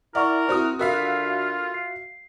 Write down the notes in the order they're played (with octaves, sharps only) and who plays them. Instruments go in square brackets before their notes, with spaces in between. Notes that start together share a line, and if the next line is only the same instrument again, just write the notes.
[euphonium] E4 [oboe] A#4 [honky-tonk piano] D5 [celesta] E5 F#5 C#6
[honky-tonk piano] C4 F#4 D#6 [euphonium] E4
[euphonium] D3 [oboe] F4 [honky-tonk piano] F#4 E5 F5 [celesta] A#4 B5
[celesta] C7